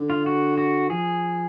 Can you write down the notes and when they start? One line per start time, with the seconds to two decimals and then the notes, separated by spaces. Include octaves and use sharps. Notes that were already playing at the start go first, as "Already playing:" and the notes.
Already playing: D3
0.10 F4
0.26 F#4
0.58 F#4
0.90 F3 G#4